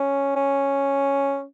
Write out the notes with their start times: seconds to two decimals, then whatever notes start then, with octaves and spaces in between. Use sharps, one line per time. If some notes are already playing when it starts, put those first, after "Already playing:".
Already playing: C#4
0.35 C#4